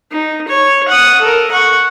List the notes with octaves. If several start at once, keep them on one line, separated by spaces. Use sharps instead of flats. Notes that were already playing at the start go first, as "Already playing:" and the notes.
D#4
C#5
F#5 D#6
A4 A#4
F#5 C#6